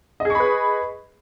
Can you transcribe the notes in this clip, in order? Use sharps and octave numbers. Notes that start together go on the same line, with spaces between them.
G#4 B4 D#5 B5 C#6